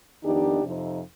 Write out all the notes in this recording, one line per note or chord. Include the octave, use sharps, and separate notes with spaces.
F2 D#3 B3 D4 D#4 G4
F2 C3 F3 C4 D#4